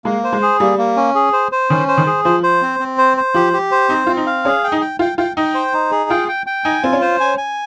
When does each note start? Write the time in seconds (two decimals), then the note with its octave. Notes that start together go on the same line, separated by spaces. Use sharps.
0.05 G#3 A#3
0.24 C5
0.33 G#3
0.42 G#4
0.60 G3 A#3
0.78 A#3
0.97 C#4
1.15 G#4
1.33 C5
1.52 C5
1.70 D#3 C#4
1.88 C5
1.98 D#3
2.07 G#4
2.25 F3 C5
2.43 C5
2.62 C4
2.79 C4
2.98 C5
3.17 C5
3.34 F3 G4
3.53 G4
3.71 C5
3.89 C4 D#4
4.07 C4 F4
4.17 D#4
4.26 F5
4.45 C#4 G#4
4.64 G5
4.72 D#4
4.81 G5
4.99 F4 G5
5.18 F4 G5
5.37 D#4 G5
5.54 C5
5.74 D#4
5.91 G#4
6.10 F4 G5
6.28 G5
6.47 G5
6.64 D#4 G#5
6.83 C4 F4
6.93 C#4
7.01 C5
7.20 G#5
7.38 G#5